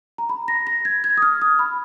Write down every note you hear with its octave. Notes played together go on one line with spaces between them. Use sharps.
A#5
B5
A#6
A#6
G#6
G#6
D#6
F6
D#6
B5